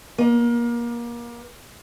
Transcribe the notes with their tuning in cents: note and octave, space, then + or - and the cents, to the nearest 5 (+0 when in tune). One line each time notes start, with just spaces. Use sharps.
A#3 +30